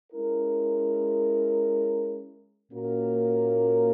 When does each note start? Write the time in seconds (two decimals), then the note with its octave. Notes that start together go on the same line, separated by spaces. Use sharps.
0.13 G#3 C#4 E4 A#4
2.72 A#2 A#3 C#4 F#4 A#4